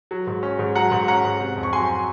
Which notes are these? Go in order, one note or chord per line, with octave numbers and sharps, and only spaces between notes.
F#3
G#2
C#4
G#2
F#3 F#5 A#5
G#2
C#4 F#5 A#5
G#2
C3
F2
C#6
F#3 G#5 C6